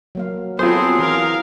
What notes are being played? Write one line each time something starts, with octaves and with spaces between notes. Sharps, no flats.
F#3 A#3 F5
F#3 B3 C4 F4 G#4 A4 C5 C6
E3 A#4 F5